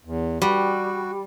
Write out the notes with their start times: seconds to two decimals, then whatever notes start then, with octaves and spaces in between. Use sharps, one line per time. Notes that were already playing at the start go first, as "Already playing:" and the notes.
0.05 E2
0.42 G3 F#4